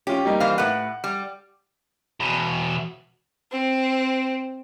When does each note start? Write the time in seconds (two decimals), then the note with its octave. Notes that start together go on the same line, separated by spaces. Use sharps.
0.07 C#4 F4 G4
0.25 G3 A#3 D#4
0.40 E3 C5 F5
0.58 A2 B4 F#5
1.04 G3
2.20 E2 B2
3.52 C4